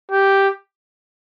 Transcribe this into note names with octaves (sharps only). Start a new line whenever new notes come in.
G4